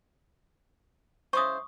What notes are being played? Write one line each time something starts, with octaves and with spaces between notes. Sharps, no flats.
C#3 E4 C5 C#6 D#6